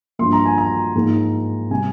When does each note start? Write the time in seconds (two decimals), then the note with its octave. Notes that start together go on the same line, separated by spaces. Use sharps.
0.19 G2 F3 A#3 C6
0.33 A#5
0.45 G#5
0.58 A#5
0.95 G#2 F3 A#3
1.71 C3 G3 G#5